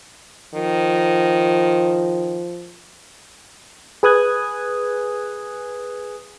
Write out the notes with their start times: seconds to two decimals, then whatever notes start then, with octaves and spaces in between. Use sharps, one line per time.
0.54 D#3 F3
4.03 G#4 B4 G#5 D#6 F#6 G#6